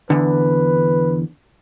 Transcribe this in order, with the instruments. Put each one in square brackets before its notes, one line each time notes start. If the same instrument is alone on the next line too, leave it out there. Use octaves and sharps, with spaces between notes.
[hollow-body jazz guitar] E2 D3 [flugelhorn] B4